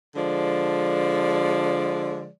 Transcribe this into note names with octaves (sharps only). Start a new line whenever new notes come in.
D3 F3 G#3 D5